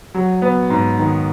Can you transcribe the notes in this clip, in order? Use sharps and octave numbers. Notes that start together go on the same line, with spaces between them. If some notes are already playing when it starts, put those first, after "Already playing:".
F#3
B3
G#2
D#3